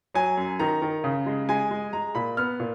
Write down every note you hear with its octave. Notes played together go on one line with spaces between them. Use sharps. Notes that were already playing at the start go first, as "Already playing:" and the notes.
F#3 G#5
F#2
D#3 A#5
D#3
C#3
G#3
G#3 G#5
G#3
G#3 A#5
A#2 B5
B3 F6
A#2